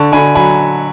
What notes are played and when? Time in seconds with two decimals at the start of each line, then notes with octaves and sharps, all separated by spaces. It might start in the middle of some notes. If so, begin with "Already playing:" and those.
Already playing: D3 A5 C#6
0.12 D3 G#5 B5
0.35 F#3 G#5 B5